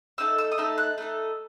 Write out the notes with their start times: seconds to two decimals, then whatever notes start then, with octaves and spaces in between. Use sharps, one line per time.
0.18 A3 D#4 A4 E6
0.38 E6
0.52 D#6
0.58 A3 D#4 A4 E6
0.78 F#6
0.98 A3 D#4 A4